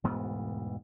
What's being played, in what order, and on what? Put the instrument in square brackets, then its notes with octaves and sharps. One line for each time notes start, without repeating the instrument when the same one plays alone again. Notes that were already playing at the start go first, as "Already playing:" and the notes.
[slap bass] E1 D2 G#2 B3